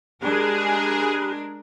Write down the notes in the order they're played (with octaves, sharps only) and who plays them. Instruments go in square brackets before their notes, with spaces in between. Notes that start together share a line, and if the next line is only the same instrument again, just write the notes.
[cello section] G#3 D4 A#4 [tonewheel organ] G4 B5 F#6 [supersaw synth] G#4